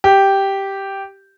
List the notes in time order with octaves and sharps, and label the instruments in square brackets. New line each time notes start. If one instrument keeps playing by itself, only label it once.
[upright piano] G4